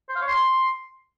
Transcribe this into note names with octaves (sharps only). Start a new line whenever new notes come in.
C5
F5
C#5
C6